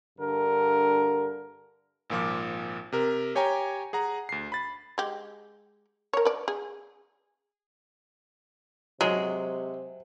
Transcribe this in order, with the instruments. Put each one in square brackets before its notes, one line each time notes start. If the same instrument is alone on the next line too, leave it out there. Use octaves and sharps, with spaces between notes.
[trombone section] G2 D3 A#4
[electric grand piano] G#1 A#2 F3 D6
C3 A#4
G4 C#5 G5 G#5 A#5
G#4 F#5 A#5
D2 C7
B5 A6
[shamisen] G#3 G4
A#4 C#5
B4 D5
G#4
[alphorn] C3 [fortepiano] F#3 [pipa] G#3